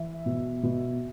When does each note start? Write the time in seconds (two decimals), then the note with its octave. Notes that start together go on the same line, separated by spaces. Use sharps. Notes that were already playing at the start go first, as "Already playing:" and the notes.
Already playing: E3 E5
0.26 B2
0.63 B2